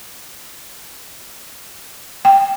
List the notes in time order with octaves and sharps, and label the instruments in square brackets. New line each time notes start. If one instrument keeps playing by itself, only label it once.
[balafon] G5